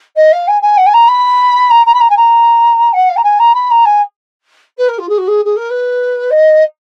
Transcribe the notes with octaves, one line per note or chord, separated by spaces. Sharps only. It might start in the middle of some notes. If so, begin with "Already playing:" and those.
D#5
F5
G#5
G#5
F#5
G#5
A#5
B5
A#5
A#5
B5
A#5
G#5
A#5
F#5
F5
A#5
G#5
A#5
B5
A#5
G#5
B4
A#4
F4
G#4
F#4
G#4
G#4
A#4
B4
D#5